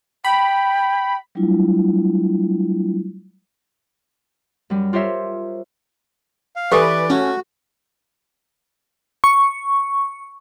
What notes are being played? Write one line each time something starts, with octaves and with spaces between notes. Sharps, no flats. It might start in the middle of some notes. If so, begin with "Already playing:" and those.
G5 B5
F#3 G3 A3 D4 E4 F4
F#2 G3
F4 G4 A#4 C5 C#5 E5
F5
E3 G4 A4 B4 D5 G#5
A3 C#4 F#4
C#6